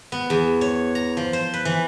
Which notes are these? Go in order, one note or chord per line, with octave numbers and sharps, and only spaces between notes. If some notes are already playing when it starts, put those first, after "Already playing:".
B3
E2
C#5
A#5
F3
C5
B4
E3